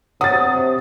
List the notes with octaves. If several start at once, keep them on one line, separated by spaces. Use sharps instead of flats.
C3 F#3 D#6 A6